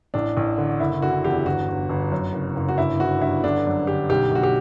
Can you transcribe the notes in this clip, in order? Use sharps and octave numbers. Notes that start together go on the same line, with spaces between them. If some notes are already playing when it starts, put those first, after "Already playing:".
A1 D4
A1
D3
F#1 E4
D3 F#4
E2 G4
G1 F#4
G1
G1
F#2
F#1
F#1
F#4
G1 E4
G1 F#4
G2 E4
D3 D4
F#2
D3 G4
B1 G4
B1 F#4
G4